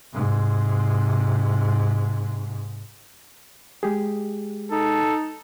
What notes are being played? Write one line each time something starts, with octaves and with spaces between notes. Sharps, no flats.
G#2 C3
G#3 G4 G#4
D#4 A4